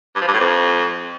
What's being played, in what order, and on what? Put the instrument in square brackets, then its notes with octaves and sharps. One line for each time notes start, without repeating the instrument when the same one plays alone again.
[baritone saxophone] G2
F3
G2
A2
F2